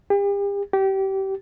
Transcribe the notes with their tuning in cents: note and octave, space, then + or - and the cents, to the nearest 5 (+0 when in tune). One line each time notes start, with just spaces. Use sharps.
G4 +40
G4 -25